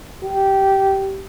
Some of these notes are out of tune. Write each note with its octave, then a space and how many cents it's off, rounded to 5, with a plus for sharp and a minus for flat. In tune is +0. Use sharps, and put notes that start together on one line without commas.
G4 -15